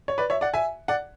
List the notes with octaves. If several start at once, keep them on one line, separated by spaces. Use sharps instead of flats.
C#5
B4 D5
C#5 E5
D5 F#5
E5 G#5
D5 F#5